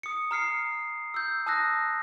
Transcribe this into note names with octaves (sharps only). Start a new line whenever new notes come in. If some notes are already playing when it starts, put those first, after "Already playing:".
D#6 C#7
A#5 F6 C7 C#7
E6 G6
A5 D#6 E6 F#6 A#6